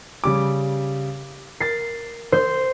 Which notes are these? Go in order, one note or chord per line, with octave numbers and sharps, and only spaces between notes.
C#3 G3 D6
A#4 A6 C7
C5